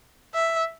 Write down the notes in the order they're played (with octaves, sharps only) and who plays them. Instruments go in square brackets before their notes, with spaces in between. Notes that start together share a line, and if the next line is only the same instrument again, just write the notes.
[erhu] E5